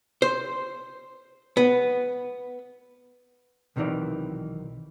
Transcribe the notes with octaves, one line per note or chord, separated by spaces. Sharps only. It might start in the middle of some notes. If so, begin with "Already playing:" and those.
C5
B3
B1 C3 D#3 E3 D#4 D5